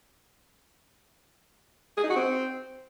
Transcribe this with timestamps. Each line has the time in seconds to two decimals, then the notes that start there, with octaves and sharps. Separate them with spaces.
1.97 G#4
2.04 D#4
2.10 F#4
2.16 C4